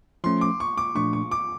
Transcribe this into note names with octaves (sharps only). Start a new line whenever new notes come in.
F3 A3 C#4 C6
D6
C#6
D6
A#2 F3 A3 D4 C#6
C#6
D6